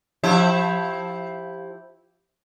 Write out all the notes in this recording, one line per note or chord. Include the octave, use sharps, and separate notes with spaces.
F3 E4 G4